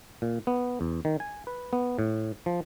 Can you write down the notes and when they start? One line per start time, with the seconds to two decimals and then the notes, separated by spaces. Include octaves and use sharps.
0.22 A#2
0.47 B3
0.81 E2
1.05 D#3
1.20 G#5
1.47 B4
1.73 B3
1.99 A2
2.46 F3